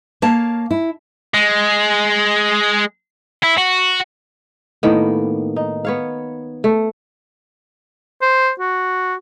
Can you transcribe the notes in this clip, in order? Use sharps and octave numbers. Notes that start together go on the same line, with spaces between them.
A#3 C#5 F5 A5
E4
G#3
E4
F#4
A2 D#3 A#3 B3
D#4
B3 C#5 F5
A3
C5
F#4